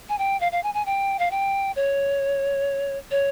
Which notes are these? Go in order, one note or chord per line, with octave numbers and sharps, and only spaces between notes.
G#5
G5
F5
F5
G#5
G#5
G5
F5
G5
C#5
C#5